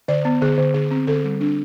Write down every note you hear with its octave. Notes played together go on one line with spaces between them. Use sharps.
D3 D5
B3
D3 G#4
D3
D3 G#4
C4
D3 A4
G3
D4